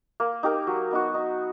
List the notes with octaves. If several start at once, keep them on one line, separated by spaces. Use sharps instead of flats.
A#3
D#4 G4 A#4
F#3
B3 D#4 F#4
D#4